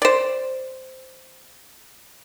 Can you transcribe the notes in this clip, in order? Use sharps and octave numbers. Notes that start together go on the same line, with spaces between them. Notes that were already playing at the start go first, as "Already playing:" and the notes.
C5 D5